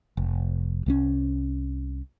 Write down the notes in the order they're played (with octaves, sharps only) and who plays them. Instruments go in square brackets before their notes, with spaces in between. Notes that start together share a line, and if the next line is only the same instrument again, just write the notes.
[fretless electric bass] F1
C2 G#3 C#4